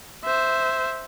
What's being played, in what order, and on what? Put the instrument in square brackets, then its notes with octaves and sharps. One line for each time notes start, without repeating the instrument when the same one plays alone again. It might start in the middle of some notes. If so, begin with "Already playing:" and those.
[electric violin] C5 E5